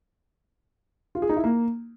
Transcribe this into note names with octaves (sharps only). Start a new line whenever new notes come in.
F4
G#4
D#4
E4
A#3